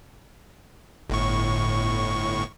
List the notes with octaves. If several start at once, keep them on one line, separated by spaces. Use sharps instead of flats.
G1 A2 C#6